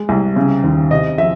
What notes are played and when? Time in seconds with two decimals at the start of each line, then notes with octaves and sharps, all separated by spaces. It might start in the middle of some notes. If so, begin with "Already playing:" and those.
Already playing: G#3
0.09 C2
0.36 C#3
0.64 D#2
0.91 C3 D#5
1.18 F3 E5